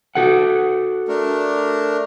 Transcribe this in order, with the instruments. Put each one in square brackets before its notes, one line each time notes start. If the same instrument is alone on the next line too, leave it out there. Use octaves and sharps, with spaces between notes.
[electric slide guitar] F#4 A4 F#5
[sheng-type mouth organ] A3 D4 A#4